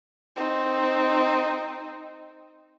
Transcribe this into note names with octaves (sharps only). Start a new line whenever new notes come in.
C4 D#4